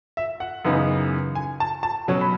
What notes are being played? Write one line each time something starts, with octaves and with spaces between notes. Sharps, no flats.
E5
F#5
F#2 C#3 E3 B3 D#4
G#5
A5
A5
B2 F#3 C#4
B5